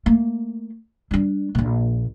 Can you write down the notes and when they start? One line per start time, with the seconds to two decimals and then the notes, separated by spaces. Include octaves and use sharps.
0.06 A3 A#3
1.11 G3 D4
1.55 A#1 A#2